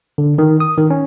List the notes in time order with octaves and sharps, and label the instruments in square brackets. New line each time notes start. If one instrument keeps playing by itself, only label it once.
[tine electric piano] D3
D#3
D#6
D#3
C#4